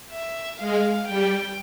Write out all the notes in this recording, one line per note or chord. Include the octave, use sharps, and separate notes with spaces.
E5
G#3 F5
G3 G5